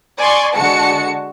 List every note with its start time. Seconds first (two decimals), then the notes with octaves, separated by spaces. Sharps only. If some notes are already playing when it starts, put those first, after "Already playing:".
0.19 D5 G#5 C6 C#6
0.55 D3 G#3 F#4 A5 C#7